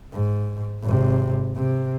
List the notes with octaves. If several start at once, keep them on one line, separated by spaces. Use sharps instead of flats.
G#2
G#1 C3
C3